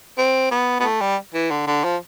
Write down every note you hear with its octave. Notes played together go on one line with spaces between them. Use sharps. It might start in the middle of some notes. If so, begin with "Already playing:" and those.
C4
B3
B3
A3
G3
E3
D3
D3
F3